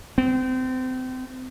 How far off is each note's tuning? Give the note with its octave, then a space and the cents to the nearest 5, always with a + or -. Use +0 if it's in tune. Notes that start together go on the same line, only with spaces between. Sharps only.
C4 -30